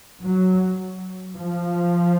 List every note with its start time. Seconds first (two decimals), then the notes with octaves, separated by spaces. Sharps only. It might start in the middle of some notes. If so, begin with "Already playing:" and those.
0.24 F#3
1.38 F3